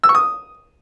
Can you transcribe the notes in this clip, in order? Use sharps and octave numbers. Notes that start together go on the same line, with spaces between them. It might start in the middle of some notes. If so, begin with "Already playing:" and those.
E6
C#6
D#6